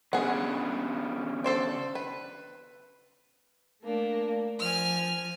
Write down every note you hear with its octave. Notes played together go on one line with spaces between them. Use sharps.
C#3 B3 D4 G#4 F#5
A4 C5 D5
B4
A3 A#3 D4
F3 G#5 F6